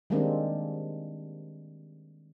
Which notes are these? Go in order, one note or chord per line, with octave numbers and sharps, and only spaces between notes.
D#3 G3 G#3 A#3 C4 D4